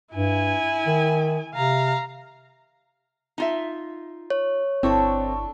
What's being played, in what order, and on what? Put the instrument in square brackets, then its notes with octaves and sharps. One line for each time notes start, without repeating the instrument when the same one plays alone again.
[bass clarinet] G2 [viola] E4 G#5
[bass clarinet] D#3
[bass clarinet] C3 [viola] F5 A#5
[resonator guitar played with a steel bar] D#4 F4 E5
[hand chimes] C#5
[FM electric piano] G1 E4 C#6 [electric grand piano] C4 [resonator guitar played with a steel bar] D4 A4